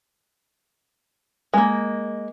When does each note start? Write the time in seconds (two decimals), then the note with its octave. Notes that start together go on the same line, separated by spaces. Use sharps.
1.54 G#3 A#3